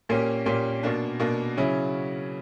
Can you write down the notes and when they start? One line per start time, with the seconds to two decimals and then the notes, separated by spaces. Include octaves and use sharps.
0.09 A#2 A#3 C#4 G4
0.46 A#2 A#3 C#4 G4
0.83 B2 A#3 D4
1.19 B2 A#3 D4
1.57 C#3 F#3 C#4 E4